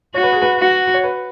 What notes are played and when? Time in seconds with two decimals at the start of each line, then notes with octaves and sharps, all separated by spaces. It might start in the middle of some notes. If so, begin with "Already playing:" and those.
0.14 F#4 C#5
0.23 B4
0.33 G#4
0.42 B4
0.59 F#4
0.94 C#5
1.04 B4